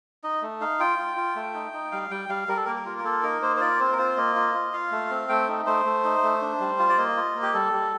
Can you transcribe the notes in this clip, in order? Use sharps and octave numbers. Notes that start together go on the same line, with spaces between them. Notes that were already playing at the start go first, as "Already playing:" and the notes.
D#4 D#5
A3
D#4 F5
F4 G5
F4
F4
A3
D#4
D#4
G3 F5
G3 G5
G3 F5
G3 A#4
A4
A#3 A#4
A#4
F4
A#4
A#3 A4
D#4 A#4
A#3 C5
C5
F4 D5
C4 C5
A#4
F4 C5
A#3 D#5
F4
F4
F4 F5
A3
C4
A3 G5
D#4
A3 C5
A3
D#4
A3
D4
G3
F4
D5
A#3 D#5
F4
A#3
G4
G3 A4
G3